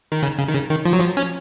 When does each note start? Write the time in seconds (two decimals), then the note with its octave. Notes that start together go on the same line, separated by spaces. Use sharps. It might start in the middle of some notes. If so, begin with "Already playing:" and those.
0.12 D#3
0.23 C#3
0.38 C#3
0.48 D#3
0.54 C#3
0.70 D#3
0.85 F3
0.93 F#3
1.00 F3
1.17 C#4